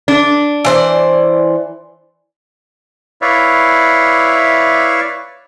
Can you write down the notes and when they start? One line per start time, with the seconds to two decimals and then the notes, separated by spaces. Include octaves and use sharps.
0.08 D4
0.65 E3 C5 D5
3.22 E4 B4 C#5 D5 E5 F5